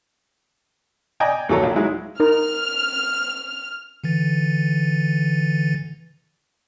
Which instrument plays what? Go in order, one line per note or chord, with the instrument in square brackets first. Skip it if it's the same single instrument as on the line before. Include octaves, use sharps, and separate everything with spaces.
[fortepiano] D5 D#5 G5 G#5 A#5
D#2 E3 F#3 A4 C#5 A#5
A#1
F#3 G#3 D#4 E4
[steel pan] D#4 A#4 [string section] F6
[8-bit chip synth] D3 E3 A6